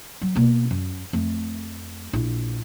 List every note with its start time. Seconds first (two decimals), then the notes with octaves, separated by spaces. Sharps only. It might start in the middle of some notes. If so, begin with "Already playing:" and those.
0.21 F#3
0.35 B2 A#3
0.71 F#2
1.13 F2 A3
2.13 A#1 E4